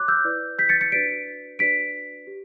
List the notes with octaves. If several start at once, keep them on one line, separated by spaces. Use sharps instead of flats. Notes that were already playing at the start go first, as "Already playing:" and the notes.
Already playing: F#4 C#5 D6 F#6
E6 G6
E4 B4 D5
G6 B6
A6 C#7
A6 C#7
D4 F#4 B4 D5 B6 D7
D4 F#4 B4 D5 B6 D7
G4